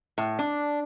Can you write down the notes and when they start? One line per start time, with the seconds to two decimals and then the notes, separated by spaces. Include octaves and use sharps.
0.18 A2
0.39 D4